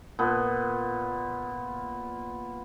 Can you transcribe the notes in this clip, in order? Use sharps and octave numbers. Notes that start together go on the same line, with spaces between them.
A#2 B3